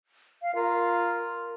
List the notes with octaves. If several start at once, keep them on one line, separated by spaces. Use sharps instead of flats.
F5
F4 A#4